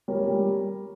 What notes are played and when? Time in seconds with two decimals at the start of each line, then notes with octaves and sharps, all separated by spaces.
0.08 G3 A#4 C#5
0.27 G3